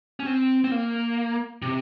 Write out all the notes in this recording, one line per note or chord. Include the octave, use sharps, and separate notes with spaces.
C#4
C4
C4
A#3
C3